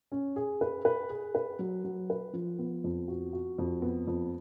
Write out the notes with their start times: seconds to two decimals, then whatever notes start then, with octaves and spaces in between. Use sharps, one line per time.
0.12 C#4
0.36 G#4
0.61 B4
0.85 B4
1.10 G#4
1.35 B4
1.59 F#3
1.84 F#3
2.10 B4
2.33 F3
2.58 B3
2.84 F2
3.08 F#4
3.33 F#4
3.58 F2
3.82 B3
4.07 F2